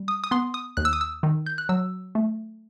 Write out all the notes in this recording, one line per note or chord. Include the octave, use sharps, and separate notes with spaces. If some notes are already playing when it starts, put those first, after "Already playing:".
Already playing: G3
D#6
D#6
B3 C6
D#6
D#2 F#6
E6
D#6
E6
D#3
G6
F#6
F#3 E6
A3